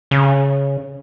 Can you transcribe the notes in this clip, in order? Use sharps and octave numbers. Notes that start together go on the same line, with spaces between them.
C#3